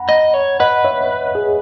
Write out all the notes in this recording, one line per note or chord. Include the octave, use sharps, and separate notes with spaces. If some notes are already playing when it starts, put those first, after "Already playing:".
Already playing: F#5 A#5 B5
D#5
C#5
B4 D#5 F#5
C#5 E5
G#4